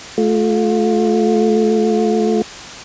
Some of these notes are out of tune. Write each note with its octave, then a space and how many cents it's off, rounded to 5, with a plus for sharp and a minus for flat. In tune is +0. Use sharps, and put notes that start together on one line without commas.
A3 -20 F4 +25